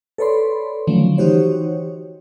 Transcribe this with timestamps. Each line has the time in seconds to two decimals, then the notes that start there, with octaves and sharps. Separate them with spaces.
0.18 A4 B4 C#5 D5 B5 C6
0.87 D3 D#3 F3 F#3 A3 C#4
1.18 E3 D#4 F#4 G4 C5 C#5